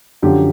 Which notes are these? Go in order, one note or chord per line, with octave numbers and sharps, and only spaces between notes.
F#2 D3 F3 G4